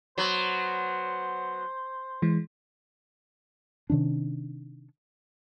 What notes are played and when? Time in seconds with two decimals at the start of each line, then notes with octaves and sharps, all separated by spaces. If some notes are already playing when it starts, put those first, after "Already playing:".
0.18 F#3 B3 C5
2.22 E3 G#3 C6
3.90 C3 D#3 C#4 D4